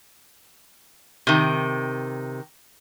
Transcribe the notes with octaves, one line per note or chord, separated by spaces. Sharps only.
C3 D#3